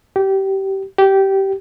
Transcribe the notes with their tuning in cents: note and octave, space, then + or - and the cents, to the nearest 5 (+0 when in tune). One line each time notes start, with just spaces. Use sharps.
G4 -20
G4 -15